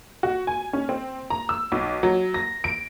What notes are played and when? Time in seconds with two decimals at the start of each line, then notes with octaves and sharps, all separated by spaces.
0.23 F#4
0.47 G#5
0.73 C#4
0.89 C4
1.30 A#5
1.49 E6
1.72 B1
2.03 F#3
2.34 A#6
2.64 D7